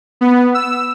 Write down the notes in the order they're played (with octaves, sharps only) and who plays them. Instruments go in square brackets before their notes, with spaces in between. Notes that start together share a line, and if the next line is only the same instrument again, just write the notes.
[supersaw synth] B3
E6